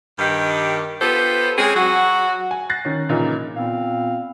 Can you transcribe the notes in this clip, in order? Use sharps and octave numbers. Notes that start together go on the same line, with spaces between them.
G2 D#3 G4
B3 F4 G4 A4 B4 C5
G#3 C4 C#4 G#4
F#3 F#4
G#5
F#6 A6 A#6 C7
D#3 C#4
A#2 C#3 E3 A#3 D#4 E4
A#2 B3 C4 F5